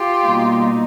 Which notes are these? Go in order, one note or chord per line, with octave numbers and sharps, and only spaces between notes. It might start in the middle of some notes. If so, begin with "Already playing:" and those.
Already playing: F4 G4
B2 G3 A#3 D#4